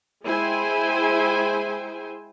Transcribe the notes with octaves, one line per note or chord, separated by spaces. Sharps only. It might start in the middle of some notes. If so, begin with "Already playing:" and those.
G#3 E4 G#4 C5 G5 G#5